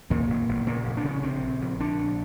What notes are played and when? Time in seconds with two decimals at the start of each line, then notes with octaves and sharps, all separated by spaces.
0.10 D#2 A#2 A#3
0.30 F1
0.49 F1
0.67 A#2 C#3 A#3
0.85 F1
0.97 D4
1.04 C#3
1.11 C#4
1.23 A#1 C3 C4
1.42 A#1
1.61 A#1
1.80 A#1 D3 D4
1.99 A#1